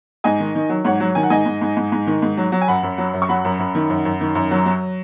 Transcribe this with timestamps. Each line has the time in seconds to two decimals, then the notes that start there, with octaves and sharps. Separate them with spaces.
0.24 G#2 D#5 G#5
0.40 D#3
0.55 D#3
0.69 F#3
0.85 G#2 C#5 F#5
1.00 F#3
1.15 D#3 G#5
1.23 F#5
1.30 G#2 D#5 G#5
1.46 G#2
1.61 G#2
1.77 G#2
1.92 G#2
2.07 D#3
2.22 G#2
2.37 F#3
2.52 F#3
2.61 G#5
2.68 F#2 F#5 B5
2.83 F#2
2.98 F#3
3.13 F#2
3.22 C#6
3.29 F#3 F#5 B5
3.45 F#2
3.59 F#2
3.75 D#3
3.90 F#2
4.05 F#2
4.21 D#3
4.35 F#2
4.51 F#3
4.66 F#3